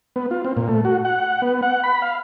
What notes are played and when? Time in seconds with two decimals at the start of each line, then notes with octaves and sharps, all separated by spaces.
0.16 B3
0.31 F4
0.45 C4
0.57 A#2
0.68 A3
0.85 F#4
1.05 F#5
1.42 B3
1.63 F#5
1.84 B5
2.02 F5